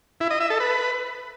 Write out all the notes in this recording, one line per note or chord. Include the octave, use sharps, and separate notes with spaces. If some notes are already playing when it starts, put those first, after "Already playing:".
E4
D#5
E5
A4
B4